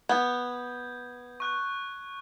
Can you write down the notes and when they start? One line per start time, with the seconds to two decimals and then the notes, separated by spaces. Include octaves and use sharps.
0.09 B3 G6 G#6
1.40 C#6 F#6